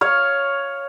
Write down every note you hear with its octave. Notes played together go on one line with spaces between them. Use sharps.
C#5 F5